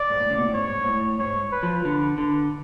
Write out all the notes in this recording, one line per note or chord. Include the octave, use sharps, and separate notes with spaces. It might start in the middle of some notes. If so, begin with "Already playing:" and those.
Already playing: D5
G#2
A2
C#3
B2
A2
G#2 C#5
G#2
A2
G#2 C#5
B4
F3
D3 B4
D3